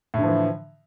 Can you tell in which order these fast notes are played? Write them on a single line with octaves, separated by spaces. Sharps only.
A2 D3 F3 E3